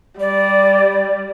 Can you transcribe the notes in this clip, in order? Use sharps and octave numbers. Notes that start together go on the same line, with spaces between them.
G3 D5